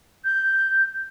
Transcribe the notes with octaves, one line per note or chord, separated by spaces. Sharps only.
G6